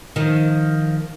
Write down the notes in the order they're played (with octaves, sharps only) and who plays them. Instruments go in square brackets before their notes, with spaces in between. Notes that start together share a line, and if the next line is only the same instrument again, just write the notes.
[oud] D#3 F3